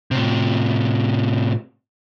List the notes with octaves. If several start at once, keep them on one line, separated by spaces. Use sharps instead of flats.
A2 C3